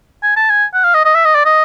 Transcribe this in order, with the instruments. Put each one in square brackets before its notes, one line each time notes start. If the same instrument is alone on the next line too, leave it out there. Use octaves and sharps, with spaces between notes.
[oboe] G#5
A5
G#5
F#5
F5
D#5
D#5
E5
D#5
D5
D#5